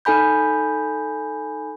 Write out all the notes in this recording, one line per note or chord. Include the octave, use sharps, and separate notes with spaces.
D#4 A4 G#5 B5 G6